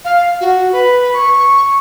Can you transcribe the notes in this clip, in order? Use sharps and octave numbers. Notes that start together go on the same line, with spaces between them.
F5
F#4
B4
C#6